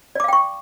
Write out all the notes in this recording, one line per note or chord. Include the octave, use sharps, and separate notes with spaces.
D5 F5 G5 C#6 D6